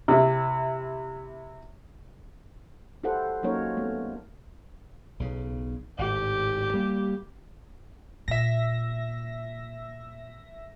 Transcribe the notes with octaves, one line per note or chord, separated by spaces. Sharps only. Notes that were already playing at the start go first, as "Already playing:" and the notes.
C3 E4
E4 G4 A4 C5 F#5
F#3 A#3 C#4 D#4 A#4 C#5
A3 B3
B1 C#3
G#1 A2 G4
G3 A#3
A#2 E5 A#6